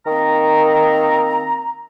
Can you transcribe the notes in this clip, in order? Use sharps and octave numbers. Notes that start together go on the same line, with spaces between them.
D#3 A#3 C4 A#5